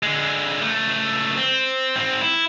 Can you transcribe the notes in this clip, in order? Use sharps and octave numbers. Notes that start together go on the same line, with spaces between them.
D3 G#3
C#2 A3
C4
G#2 C4
E4